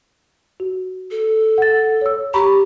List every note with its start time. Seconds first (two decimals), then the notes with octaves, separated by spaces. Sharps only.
0.60 F#4
1.11 A4
1.58 F#5 A6
2.01 C#5 E6
2.34 G4 A#5 B5 C#6